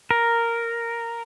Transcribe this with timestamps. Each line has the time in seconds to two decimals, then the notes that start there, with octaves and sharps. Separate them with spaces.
0.11 A#4